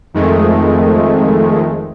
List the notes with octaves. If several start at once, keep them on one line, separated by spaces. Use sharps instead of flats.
F2 D#3 G#3 A3